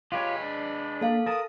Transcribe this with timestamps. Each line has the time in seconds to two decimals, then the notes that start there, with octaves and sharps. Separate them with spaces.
0.12 G#3 F4 G4 B4 C#5
0.42 D4
1.01 A#3 A4 F5
1.26 A#4 A5 D#6